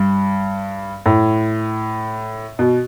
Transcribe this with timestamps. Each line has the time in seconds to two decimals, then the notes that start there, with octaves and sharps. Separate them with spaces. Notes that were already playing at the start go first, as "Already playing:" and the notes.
Already playing: G2
1.06 A2
2.59 B2